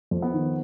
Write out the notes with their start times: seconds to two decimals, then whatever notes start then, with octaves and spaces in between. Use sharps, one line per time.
0.11 F2
0.22 B3
0.34 D#3